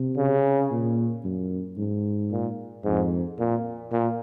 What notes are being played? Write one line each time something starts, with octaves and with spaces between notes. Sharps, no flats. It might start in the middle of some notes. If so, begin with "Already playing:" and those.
Already playing: C3
C#3
A#2
F#2
G#2
A#2
F2 G#2
A#2
A#2